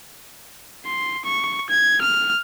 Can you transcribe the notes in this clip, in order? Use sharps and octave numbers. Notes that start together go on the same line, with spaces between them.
C6
C#6
G#6
F6